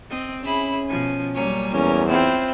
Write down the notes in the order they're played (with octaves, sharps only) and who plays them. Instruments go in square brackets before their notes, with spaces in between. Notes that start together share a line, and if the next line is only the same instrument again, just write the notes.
[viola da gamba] C4 D#5
[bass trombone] C#4 [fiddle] E4 B5 [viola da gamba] G#4
[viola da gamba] B2 F3 [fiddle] G#5
[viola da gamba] F#3 G3 A#3 [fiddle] C#5 G#5
[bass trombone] E2 [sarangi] C#4 [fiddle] A#4
[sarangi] C4 [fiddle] E4 [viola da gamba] F4 C5